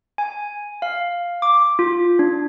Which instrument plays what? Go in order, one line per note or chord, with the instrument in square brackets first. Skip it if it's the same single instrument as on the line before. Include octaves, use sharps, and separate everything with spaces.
[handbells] G#5
F5
D6
F4
D4